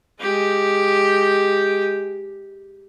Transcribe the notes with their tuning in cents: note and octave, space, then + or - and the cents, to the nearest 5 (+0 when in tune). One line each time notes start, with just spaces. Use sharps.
G#3 +0 G4 +0